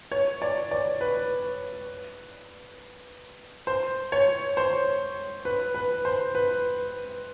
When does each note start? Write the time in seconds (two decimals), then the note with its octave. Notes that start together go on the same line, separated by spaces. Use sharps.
0.12 C#5
0.42 D5
0.71 D5
1.01 B4
3.67 C5
4.12 C#5
4.57 C5
5.45 B4
5.74 B4
6.05 C5
6.35 B4